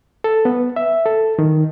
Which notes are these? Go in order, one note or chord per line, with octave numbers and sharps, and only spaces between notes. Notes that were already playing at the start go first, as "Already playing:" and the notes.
A4
B3
E5
A4
D#3